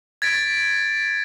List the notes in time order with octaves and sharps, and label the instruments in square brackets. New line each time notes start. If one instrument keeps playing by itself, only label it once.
[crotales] G#6 A6 B6 D7